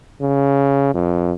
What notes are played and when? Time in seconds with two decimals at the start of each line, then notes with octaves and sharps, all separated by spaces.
0.21 C#3
0.94 F2